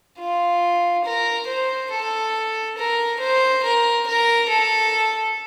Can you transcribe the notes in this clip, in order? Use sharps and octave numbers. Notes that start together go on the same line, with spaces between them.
F4
A#4
C5
A4
A#4
C5
A#4
A#4
A4